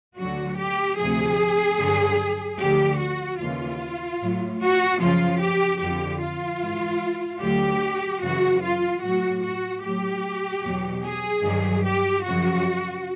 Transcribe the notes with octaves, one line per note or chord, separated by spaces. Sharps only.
D2 D3 F#3 F#4
G4
D2 C3 F3 G#4
G2 D3 F#3
D2 D3 F3 G4
F#4
D#2 C#3 E3 F4
A2 F#3
F#4
F#2 C#3 F3 F4
G4
F2 D3 F3 G4
F4
G#2 E3
D2 D3 F#3 G4
F#2 C#3 E3 F#4
F4
A2 F#3 F#4
F#4
A2 F#3 G4
E2 B2 F#3
G#4
G2 D#3 F#3
G4
F#2 C#3 F3 F#4